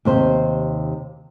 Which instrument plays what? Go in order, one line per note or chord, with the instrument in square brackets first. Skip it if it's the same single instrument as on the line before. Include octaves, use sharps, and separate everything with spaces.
[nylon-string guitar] D#2 C3 C5